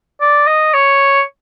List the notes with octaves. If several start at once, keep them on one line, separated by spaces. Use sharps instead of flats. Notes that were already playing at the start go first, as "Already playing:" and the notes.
D5
D#5
C#5